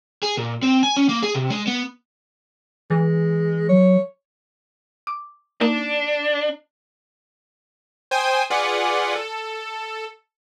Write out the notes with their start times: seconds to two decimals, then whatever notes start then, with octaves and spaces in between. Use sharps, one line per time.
0.23 G#4
0.37 A#2
0.62 C4
0.83 G#5
0.96 C#4
1.09 A#3
1.23 G#4
1.35 C3
1.50 G#3
1.67 B3
2.90 E3 G#3
3.69 F#3 C#5
5.07 D6
5.61 A#3 D4 D#4
8.11 C5 G5 G#5 D#6
8.50 F4 G#4 B4 D5 F#5
9.15 A4